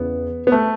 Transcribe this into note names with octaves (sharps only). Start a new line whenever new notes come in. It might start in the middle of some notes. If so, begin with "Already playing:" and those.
Already playing: E2 C#3 E3 B3
B3
A3